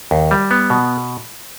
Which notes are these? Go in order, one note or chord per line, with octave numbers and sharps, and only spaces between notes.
D#2
G3
B3
B2